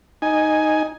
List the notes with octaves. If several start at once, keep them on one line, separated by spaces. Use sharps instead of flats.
D#4 G#5